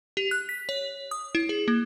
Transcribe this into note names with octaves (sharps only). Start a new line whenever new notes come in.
G4
F#6
B6
C#5
D#6
E4
G#4
A#3